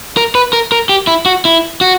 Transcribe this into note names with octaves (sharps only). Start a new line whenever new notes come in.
A#4
B4
A#4
A#4
G4
E4
F#4
E4
F#4